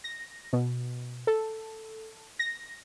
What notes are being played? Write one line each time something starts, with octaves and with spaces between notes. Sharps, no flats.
A#6
B2
A4
A#6